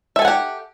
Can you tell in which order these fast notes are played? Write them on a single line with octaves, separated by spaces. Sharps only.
E5 A4 G#5 F#5 G4